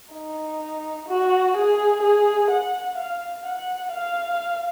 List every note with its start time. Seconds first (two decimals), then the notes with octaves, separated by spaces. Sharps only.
0.13 D#4
1.08 F#4
1.56 G#4
2.02 G#4
2.50 F#5
2.98 F5
3.45 F#5
3.93 F5